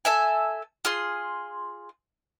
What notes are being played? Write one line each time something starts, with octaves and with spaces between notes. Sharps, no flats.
A4 E5 G#5
F4 G#4 C6